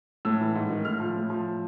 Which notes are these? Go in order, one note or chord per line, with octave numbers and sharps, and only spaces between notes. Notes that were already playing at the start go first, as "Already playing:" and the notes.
A2 E6
E3
G#2
D#3
A2 F6
F3
A2
F3